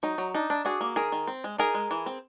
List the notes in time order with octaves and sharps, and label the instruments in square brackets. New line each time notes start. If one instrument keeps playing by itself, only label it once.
[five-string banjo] F#3 D#4
F#3
D4 D#4
D4
D4 F#4 G#4
A#3
D#3 G#4 A#4
D#3
C4
G#3
D#4 G#4 A#4
G#3
E3
C4